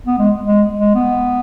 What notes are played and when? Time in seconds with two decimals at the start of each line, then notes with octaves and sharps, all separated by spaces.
0.06 B3
0.18 G#3
0.45 G#3
0.78 G#3
0.95 B3